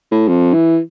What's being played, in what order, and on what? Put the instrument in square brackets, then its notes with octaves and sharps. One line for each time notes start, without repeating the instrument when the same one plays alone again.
[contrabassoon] A2
F2
E3